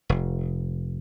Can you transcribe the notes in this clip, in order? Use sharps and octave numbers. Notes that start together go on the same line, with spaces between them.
F1